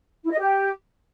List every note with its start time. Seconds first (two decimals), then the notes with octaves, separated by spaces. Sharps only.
0.23 E4
0.31 D#5
0.38 G4